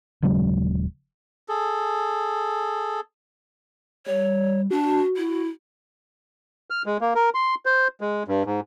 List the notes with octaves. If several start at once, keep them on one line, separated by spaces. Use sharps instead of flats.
D#1 C#3 F#3 G#3
G#4 A4
G3 C#5
D4 F#4
E4
F6
G#3
A#3
A#4
C6
C5
G#3
G2
G#2